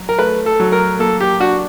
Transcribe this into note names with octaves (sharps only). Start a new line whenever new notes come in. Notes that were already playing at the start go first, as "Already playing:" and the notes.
Already playing: F#3
A#4
A3 B4
A4
F#3
A#4
A#3 A4
G4
D4 F#4